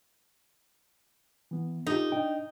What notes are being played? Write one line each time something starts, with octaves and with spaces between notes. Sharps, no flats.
E3 B3
D#4 F4 G4 A4
D4 D#5 G5